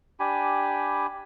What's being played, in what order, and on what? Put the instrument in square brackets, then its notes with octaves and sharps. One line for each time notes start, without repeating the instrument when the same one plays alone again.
[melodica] D4 G4 G#5 B5